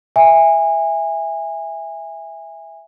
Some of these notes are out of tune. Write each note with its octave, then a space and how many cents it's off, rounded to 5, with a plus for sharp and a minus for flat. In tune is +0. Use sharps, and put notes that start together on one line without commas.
E5 +0 G#5 -25